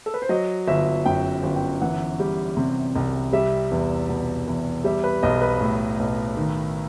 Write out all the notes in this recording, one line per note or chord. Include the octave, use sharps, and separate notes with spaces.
A4
B4
C5
F#3 D#5
G1 E5
F#2 G5
G1
G5
E3 F#5
G3
C3
C2
G3 E5
E2
B2
E2
G3 E5
B4
B1 D#5
B4
A2
B1
D#3